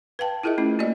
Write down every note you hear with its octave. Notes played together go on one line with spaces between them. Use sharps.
B4 F5 G5 A5
E4 F4 G#4 A#4 D#5 E5
A3 C#4 E4
A#3 F4 F#4 D5 D#5